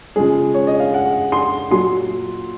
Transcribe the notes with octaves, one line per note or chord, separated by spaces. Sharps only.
C#3 F3 G#3 G#4
C#5
D#5
F5
F#5
C6
A#2 F#3 C6